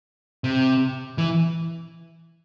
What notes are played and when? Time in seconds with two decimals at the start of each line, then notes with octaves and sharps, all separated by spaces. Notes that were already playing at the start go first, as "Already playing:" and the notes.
0.44 C3
1.18 E3